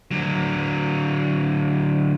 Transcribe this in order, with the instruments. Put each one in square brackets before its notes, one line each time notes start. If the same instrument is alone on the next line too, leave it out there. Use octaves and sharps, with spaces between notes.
[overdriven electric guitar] D3 F#3